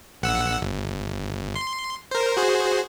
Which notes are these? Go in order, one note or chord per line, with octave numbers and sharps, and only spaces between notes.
A#1 F#5 E6
G1
C6
A#4 C5
F#4 G#4 C5